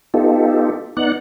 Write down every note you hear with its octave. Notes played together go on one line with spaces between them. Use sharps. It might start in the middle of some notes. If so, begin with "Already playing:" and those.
B3 D#4 F4 G4 A4
B3 D#4 D5 F#5 F#6